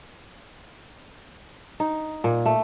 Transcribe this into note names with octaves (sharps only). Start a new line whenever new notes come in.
D#4
A#2
A3